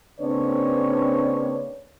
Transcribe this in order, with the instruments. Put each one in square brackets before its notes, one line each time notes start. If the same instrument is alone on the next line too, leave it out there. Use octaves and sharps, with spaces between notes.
[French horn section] C#3 A#3 C4 D4 B4 C#5